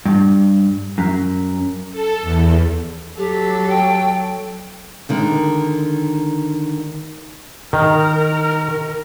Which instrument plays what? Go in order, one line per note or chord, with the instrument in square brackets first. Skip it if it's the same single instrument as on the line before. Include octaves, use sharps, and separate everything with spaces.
[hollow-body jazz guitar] G2
F#2
[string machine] A4
E2
[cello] F#3 A4 [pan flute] G4
[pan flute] G5
[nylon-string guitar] D3 D#3 G#3
[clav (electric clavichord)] D#3 [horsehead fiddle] A#4